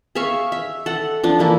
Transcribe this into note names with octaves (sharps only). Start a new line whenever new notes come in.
G#4 E5 F5 C#6
E5
A4 F#5
F3 D4
E3 A#3 E4